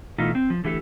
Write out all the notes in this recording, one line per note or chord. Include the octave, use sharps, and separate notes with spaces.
B2 E3 A3 D#4 F4
C4
F3
D3 E3 A3 F4 G4 A4